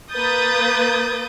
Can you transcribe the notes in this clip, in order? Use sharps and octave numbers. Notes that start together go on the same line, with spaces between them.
A#3 B4 D#6 G6 A6